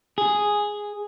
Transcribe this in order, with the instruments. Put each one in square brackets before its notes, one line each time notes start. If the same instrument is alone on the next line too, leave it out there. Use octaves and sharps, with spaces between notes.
[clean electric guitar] G#4